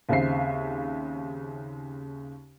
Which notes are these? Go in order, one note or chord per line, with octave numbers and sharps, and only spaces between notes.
D#2 C#3 C4 E5 C7